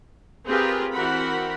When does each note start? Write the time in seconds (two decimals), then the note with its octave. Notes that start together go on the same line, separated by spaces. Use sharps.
0.46 C4 F4 G4 G#4 A#4 B4
0.92 E3 C4 F#4 A#4 F#5 B5